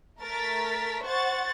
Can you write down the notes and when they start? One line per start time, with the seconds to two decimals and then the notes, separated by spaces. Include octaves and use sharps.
0.21 A3 A#4 A6 B6
1.04 C5 F#5 C#6 A6